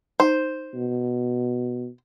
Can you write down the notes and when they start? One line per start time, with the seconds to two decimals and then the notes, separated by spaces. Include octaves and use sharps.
0.20 D#4 C5
0.75 B2